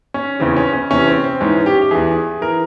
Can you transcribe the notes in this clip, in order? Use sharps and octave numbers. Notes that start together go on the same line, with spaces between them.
C#4
E2 C#3 E3 C4
C#4
C#4
E2 C3 E3 C#4
C4
C4
G#2 E3 C#4
G4
G4
E2 E3 G#4
E3 A#4